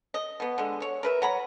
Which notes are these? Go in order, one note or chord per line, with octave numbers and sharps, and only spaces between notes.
D#5
B2 B3
D3 G#3
C#5
A#4 B4 E5
F#3 A#5 B5